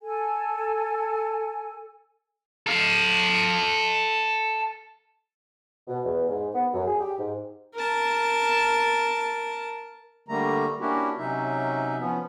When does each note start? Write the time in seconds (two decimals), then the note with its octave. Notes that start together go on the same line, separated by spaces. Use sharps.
0.01 A4 G#5
2.67 A4 F5
5.87 B2
6.04 E2
6.29 G#2
6.54 B3
6.74 F#2
6.86 G#4
7.00 G4
7.19 G#2
7.74 A#4 A5
10.28 D3 G3 A3 A#3 A#5
10.80 A#3 C#4 D4 E4 F#4 G4
11.18 C3 F#3 C#4 D#4 E5
11.99 F3 B3 C#4